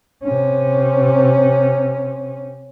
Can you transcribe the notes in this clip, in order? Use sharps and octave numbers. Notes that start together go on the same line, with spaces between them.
C3 C#4